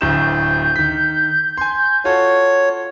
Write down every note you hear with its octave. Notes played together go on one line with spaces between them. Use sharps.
D1 D2 G6 E7
D#3 B6
G#5 C6
F4 F#4 A4 C#5